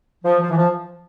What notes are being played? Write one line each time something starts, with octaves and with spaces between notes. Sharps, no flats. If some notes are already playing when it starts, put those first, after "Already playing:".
F3
F3
E3
F3